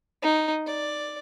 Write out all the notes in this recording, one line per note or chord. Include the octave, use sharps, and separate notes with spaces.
D#4
D5